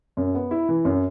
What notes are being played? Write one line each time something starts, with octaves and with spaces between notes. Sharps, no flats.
F#2
B3
E4
E3
F#2